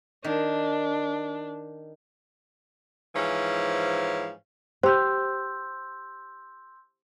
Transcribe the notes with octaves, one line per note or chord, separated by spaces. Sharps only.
D#3 D4
G#2 E3 F3 C#4
G4 C5 B5 C6 E6 G6